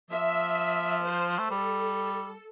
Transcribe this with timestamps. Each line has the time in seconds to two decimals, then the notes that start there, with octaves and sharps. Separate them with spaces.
0.10 F3 E5
1.04 C5
1.39 A3
1.51 G3 A4